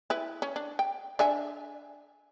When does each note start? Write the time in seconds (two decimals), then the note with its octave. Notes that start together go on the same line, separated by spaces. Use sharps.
0.10 E4 B4
0.42 C#4
0.56 D4
0.79 G5
1.19 D4 E5 G#5